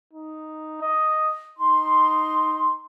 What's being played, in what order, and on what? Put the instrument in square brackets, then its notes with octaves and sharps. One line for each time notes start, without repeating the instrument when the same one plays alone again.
[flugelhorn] D#4
D#5
[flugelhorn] D#4 [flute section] C6